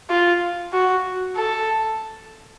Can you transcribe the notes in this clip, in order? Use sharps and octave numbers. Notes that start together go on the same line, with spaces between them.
F4
F#4
A4